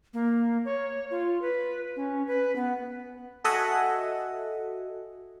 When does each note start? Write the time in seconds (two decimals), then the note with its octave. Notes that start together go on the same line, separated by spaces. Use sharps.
0.14 A#3
0.65 C#5
1.11 F4
1.42 B4
1.96 C#4
2.27 B4
2.56 B3
3.44 F#4 A4 D#5 E5 F#5 G#5